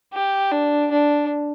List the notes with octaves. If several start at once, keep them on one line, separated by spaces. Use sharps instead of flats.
G4
D4
D4